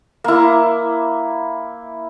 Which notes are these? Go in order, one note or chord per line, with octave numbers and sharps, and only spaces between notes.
A#3 E4